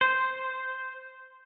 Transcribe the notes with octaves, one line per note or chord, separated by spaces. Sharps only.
C5